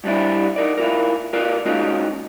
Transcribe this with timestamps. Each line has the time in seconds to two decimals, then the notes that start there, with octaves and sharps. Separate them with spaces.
0.04 G2 G3 D4 E4
0.56 D#4 A#4 D5
0.77 E4 F4 A#4
1.33 F4 A#4 B4 D5
1.66 G#3 A#3 C#4 D#4 F4 F#4